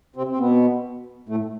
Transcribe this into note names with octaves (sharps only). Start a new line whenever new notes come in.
C3 C4
C4
B2 B3
A2 A3